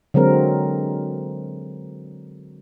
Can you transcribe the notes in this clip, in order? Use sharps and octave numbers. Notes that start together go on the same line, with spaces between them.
D3 F#3 G#3 C4 A#4